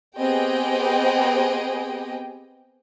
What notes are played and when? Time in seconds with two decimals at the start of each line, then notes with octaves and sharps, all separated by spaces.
0.17 B3 C4 G4 G#4 D#5 G5